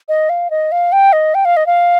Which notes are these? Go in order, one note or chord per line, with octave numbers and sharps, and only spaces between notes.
D#5
F5
D#5
F5
G5
D#5
G5
F5
D#5
F5